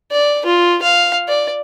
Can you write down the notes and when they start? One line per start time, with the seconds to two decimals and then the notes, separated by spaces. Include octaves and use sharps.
0.11 D5
0.45 F4
0.82 F5
1.28 D5